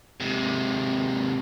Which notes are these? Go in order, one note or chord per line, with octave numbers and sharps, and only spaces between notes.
G#2 C3